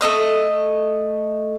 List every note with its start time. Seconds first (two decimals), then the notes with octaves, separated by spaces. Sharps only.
0.01 A3 B3 D#5 E6